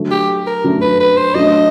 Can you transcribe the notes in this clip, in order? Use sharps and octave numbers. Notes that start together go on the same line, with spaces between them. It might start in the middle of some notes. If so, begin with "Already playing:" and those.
Already playing: D3 F#3 A3 D4
G4
A#4
D3 F#3 A3 D4
B4
B4
C5
F#3 A3 D4 D#5